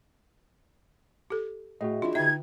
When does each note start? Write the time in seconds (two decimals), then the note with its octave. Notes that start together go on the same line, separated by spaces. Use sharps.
1.30 G4 A4
1.81 A2 F#4 G#4 D#5
2.02 E3 D4 E4 F4
2.15 D3 D#4 E5 G5 G#6